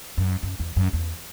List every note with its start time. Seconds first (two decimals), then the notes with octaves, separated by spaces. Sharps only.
0.18 F#2
0.43 F#2
0.60 E2
0.76 F#2
0.93 E2